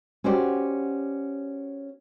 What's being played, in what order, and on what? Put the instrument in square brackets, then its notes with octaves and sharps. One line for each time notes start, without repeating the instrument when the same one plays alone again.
[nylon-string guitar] C#4 F#4 G4 C5 D5